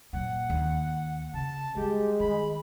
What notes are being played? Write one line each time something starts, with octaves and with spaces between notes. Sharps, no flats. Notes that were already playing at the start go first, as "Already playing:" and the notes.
A#2 F#3 F#5
D#2
C#3 A5
G3 G#3 G4
D#3 B5